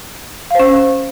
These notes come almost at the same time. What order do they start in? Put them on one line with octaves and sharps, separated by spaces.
F5 C5 C#4